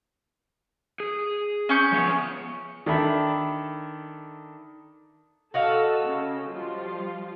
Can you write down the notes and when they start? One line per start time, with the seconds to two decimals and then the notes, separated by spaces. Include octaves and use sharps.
1.00 G#4
1.69 C#4 C#6 G6
1.92 F3 B3 G#4
2.86 D#3 D4 A4 E5 B5
5.54 F#4 A4 D#5 F5 A5 E6
6.05 C#3
6.49 F3 G3 F4